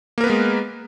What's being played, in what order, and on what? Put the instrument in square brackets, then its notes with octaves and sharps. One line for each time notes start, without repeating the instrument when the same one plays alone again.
[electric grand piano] A#3
A#4
B4
B3
G#3